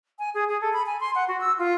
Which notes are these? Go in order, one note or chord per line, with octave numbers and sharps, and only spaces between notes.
G#5
G#4
G#4
A4
B5
G#5
C6
F#5
F#4
E6
F4